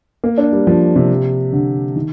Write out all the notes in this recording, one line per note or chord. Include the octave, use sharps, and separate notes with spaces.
A#3
D4
G3
F3
C3
D3
D#3